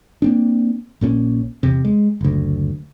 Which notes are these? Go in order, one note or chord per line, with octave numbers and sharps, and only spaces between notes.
A#3 C4 D4
A#1 A#2 F3 C#4
E2 C3
G#3
F#1 D2